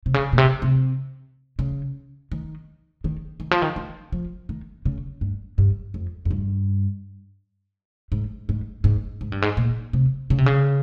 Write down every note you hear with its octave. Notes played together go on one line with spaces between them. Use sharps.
C3
C#3
A#2
C3
C3
C#3
D#3
D#3
D#3
F3
D#3
D#3
F3
D#3
C#3
G2
G2
F2
F2
G2
G#2
G#2
G#2
G#2
G2
G#2
A#2
C3
C#3
C3
C#3